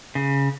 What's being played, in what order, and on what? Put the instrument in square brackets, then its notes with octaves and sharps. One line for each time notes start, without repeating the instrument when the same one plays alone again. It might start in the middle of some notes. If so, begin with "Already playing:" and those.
[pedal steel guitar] C#3